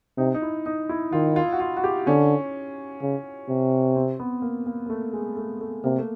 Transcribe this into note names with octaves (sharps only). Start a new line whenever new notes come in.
C3 D#4
D#4
E4
D#4
E4
D#3 F4
F4
F#4
F4
F#4
G4
D3 C#4
C#3
C3
C4
B3
A#3
A#3
A#3
A3
G#3
A3
A3
C3 A#3
A3